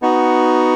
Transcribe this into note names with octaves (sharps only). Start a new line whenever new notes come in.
B3 D#4 F#4